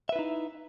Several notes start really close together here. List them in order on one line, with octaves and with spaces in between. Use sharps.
E5 B4 E4 D#4